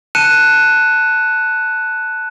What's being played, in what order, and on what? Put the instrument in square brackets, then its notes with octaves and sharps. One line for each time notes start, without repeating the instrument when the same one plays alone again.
[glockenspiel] A5 F#6 C#7 D#7 E7